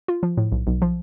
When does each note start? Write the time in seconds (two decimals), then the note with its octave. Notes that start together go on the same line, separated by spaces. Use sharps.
0.08 F4
0.23 F3
0.37 A2
0.52 B1
0.67 B1
0.82 F3